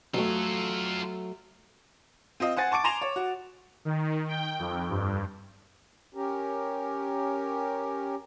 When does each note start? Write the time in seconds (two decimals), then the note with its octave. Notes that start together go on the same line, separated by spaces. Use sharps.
0.14 F#3 A3 F4 A4
2.40 C4 F4 D#5
2.57 C5 F#5 G#5 A6
2.72 A5 C#6 D6 D7
2.84 G#5 A#5 C6 E7 F7
3.01 C#5
3.16 F#4
3.85 D#3
4.29 G5
4.59 F2
4.90 G2
6.15 C#4 G4 A#4